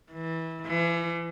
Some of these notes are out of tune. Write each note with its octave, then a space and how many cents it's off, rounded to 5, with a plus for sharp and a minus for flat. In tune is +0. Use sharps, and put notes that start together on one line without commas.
E3 -20
E3 +40